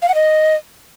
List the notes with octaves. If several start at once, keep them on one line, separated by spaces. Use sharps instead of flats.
F5
F#5
D#5